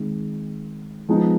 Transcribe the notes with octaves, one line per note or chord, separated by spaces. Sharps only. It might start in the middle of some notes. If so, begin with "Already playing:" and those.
Already playing: D#3 G#3 C4
F3 G#3 B3 D#4